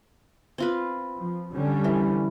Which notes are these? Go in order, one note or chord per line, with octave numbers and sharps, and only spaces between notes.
C4 F4 B4
F3
D3 G3 C#4
E3